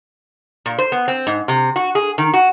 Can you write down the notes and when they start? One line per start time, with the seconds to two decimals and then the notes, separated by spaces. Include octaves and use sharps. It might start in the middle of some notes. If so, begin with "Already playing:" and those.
0.66 A#2
0.78 C5
0.92 B3
1.08 C4
1.27 G#2
1.48 C3
1.76 F#4
1.95 G#4
2.18 D#3
2.34 F#4